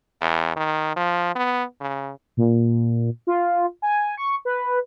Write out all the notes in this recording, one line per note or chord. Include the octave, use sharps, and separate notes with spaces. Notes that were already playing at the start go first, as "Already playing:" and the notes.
E2
D#3
F3
B3
C#3
A#2
F4
G#5
C#6
B4